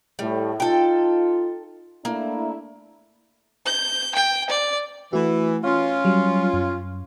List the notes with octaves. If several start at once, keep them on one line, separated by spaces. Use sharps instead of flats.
A2 G3
D#4 F4 A4 G5
A3 A#3 D4 E4
G6
G5
D5
E3 A3 F#4
C#4 F4
F#3 G3
F#2